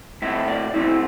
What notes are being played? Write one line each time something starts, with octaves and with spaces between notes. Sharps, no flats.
A2 A3 C4 E5
D5
A2 A3 C4 E4